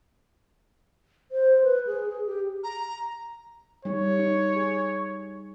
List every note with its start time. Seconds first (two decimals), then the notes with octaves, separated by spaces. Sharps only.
1.31 C5
1.64 B4
1.87 G#4
2.09 G#4
2.27 G4
2.63 A#5
3.85 G3 D#4 C#5
4.19 D#4
4.56 G#4